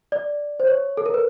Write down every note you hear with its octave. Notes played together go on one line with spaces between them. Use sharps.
D5
C5
C#5
A4
A#4
B4